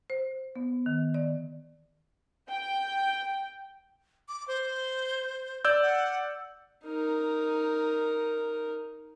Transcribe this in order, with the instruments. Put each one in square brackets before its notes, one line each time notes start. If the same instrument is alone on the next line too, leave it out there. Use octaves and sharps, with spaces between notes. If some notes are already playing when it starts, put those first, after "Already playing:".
[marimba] C5
B3
D#3
D5
[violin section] G5
[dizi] D6
C5
[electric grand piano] D5 E6 G6
[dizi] F#5
[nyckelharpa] D#4 A#4